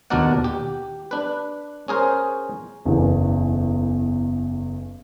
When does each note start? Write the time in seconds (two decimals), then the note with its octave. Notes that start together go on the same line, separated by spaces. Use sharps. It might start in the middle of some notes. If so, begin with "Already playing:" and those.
0.10 D#2 B2 D4 A#4 D5 F#5
0.44 G4
1.11 D4 B4
1.88 C#4 G#4 A#4 C5
2.85 F#1 B1 E2 E3